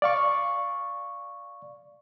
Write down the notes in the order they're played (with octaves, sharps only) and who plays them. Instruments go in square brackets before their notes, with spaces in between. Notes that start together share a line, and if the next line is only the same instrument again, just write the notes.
[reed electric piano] D5 F5 C#6